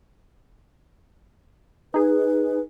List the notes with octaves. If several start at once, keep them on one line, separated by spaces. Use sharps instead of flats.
D#4 G#4 B4